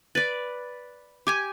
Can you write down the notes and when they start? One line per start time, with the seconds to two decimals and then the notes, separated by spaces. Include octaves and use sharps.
0.15 B4 D5 A6
1.27 G4 G#5 D6 G#6